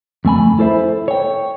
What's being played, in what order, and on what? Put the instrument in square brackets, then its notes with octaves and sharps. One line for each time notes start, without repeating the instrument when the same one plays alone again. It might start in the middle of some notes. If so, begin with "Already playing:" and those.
[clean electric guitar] F2 A3 G#5 B5
E4 A4 C5 E5
C#5 G5